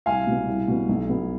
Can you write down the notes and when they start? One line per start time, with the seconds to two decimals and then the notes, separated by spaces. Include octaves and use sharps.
0.06 C2 F5 G#5
0.27 B2 B3
0.47 C2
0.68 B2 B3
0.89 B1
1.09 B2 B3